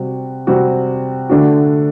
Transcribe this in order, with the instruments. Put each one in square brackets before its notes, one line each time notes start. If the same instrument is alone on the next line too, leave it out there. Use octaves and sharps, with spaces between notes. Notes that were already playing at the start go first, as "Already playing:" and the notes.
Already playing: [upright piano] C3 G3 C4 F#4
C3 G3 C4 F#4
D3 A3 D4 F#4